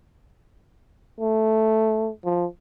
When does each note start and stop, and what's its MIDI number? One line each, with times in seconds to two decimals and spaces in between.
1.20 2.10 57
2.24 2.46 53